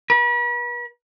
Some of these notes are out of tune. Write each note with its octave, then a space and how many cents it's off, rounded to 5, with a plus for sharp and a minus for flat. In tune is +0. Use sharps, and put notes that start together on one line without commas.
B4 -40